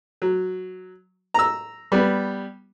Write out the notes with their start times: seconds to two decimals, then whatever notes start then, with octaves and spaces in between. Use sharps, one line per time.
0.22 F#3
1.34 A#5 E6
1.92 G3 B3